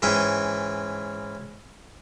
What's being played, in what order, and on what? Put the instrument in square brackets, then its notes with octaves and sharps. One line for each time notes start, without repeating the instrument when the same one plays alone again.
[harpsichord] G#2 E3 C#4 G5